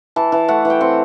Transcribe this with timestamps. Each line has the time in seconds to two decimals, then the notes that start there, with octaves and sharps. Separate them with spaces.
0.16 E3 A5
0.32 E3
0.48 A3 F#5
0.65 E3
0.70 G5
0.81 C4 F#5